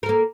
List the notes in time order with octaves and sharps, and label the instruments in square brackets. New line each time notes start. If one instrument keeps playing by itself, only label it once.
[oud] A#4
A4
A#3